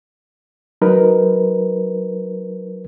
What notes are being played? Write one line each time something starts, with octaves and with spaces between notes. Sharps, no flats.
F#3 D#4 A#4 B4